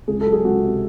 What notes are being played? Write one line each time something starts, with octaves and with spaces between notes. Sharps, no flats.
C#2 G#4
A4
F#3
G#4
C#2 F#4
C3